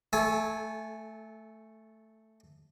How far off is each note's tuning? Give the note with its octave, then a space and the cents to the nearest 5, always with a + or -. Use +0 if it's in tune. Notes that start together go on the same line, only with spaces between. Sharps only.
A3 +0 A4 -25 G#5 +0